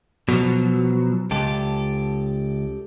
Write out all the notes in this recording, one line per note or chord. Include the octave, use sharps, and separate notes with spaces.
B2 F3 F#3
C#2 G4 A4